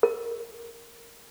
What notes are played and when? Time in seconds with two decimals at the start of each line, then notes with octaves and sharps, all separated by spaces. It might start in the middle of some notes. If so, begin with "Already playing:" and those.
0.03 A#4